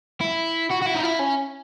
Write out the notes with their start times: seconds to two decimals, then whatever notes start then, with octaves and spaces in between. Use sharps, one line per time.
0.21 E4
0.70 F#4
0.82 F#4
0.86 E4
0.94 D#4
1.03 E4
1.19 C#4